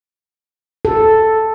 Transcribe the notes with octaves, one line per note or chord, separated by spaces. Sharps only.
A4